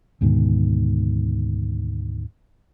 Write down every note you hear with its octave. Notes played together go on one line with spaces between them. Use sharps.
D2 G#2 B2 D#3